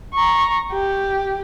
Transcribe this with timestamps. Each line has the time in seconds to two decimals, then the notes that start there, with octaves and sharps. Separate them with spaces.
0.13 A#5 C#6
0.73 G4